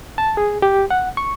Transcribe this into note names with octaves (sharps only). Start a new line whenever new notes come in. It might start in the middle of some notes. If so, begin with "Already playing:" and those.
A5
G#4
G4
F#5
C#6